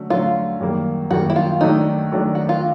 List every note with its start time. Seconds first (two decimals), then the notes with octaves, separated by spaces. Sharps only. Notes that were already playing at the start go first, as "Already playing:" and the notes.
Already playing: D3 F#3 A3 C#4 F#4
0.10 D3 F#3 A3 C#4 F4 F#4
0.60 F#2 D#3 G3 A#3
1.11 F#2 D#3 G3 A#3 F#4
1.30 E4
1.36 F4
1.61 D#3 F#3 A3 D4 D#4
2.12 D#3 F#3 A3 D4
2.35 F#4
2.49 F4